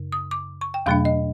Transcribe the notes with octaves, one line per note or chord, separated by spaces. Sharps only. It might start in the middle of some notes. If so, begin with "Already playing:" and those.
Already playing: F#2 C#3
D#6
D6
C#6
G5
E2 B2 F#3 A3 D4 F5
D#5